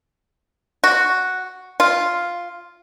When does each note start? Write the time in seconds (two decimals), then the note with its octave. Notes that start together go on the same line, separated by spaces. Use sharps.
0.84 F#4
1.80 F4